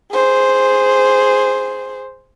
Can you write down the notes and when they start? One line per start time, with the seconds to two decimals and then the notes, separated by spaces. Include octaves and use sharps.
0.12 G#4 C5